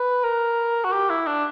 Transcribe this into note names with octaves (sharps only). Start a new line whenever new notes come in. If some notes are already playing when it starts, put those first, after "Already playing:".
Already playing: B4
A#4
F#4
G4
E4
D4